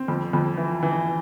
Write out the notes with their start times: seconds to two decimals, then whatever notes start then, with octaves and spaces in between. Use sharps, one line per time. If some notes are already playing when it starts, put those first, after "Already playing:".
Already playing: C4
0.08 F2
0.33 F2
0.57 E3
0.83 E3